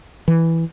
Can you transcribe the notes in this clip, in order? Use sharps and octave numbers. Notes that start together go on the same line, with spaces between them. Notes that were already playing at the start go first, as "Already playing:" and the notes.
E3